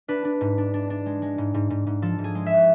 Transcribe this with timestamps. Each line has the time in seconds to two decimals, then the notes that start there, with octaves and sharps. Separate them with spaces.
0.08 D4 B4
0.25 D4
0.41 G#2
0.58 D4
0.74 D4
0.90 D4
1.06 G#3
1.22 G#3
1.38 G#2
1.54 G#2
1.70 G#2
1.87 G#2
2.02 F3 A4
2.18 G#2
2.24 G#4
2.35 G#3
2.46 E5